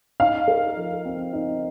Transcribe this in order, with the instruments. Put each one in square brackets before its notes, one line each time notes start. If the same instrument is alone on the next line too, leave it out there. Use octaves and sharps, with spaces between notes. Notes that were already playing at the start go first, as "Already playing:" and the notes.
[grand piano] D#4 [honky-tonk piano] F5
[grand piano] A#4
F3
C4
D#4